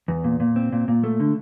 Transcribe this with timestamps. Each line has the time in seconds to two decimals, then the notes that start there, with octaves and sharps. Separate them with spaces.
0.08 E2
0.24 A#2
0.40 A#2
0.56 C4
0.72 A#2
0.88 A#2
1.04 A3
1.20 D3